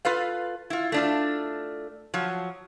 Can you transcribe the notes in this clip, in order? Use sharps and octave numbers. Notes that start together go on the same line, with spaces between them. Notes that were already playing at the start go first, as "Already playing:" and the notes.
F4 A4 B4 F5
E4 F4
A3 D4 F4
F3 F#3